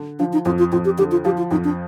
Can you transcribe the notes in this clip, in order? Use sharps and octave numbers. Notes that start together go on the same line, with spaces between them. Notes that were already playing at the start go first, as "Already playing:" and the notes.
Already playing: D3
F3 D4
D#4
F2 F4
F4
F2 F4
G4
D3 G4
F4
F3 G4
F4
F2 D#4
D4